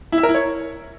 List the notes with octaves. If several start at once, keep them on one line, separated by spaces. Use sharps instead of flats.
E4
E5
A#4
E4
C#5